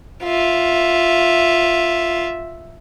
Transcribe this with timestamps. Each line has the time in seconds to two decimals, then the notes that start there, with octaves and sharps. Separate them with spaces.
0.23 F4 E5